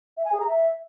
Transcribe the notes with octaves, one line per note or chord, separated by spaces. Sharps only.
E5
G#5
G#4
A#5
E5